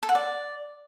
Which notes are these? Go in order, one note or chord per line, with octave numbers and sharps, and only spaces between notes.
A4
F#5
D5